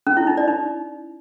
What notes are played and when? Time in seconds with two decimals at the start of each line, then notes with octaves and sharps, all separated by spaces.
0.07 C#4
0.17 E4
0.27 D#4
0.37 D5
0.48 D#4